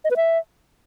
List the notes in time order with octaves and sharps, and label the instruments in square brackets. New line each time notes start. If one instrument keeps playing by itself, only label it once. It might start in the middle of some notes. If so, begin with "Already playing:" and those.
[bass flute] D#5
B4
E5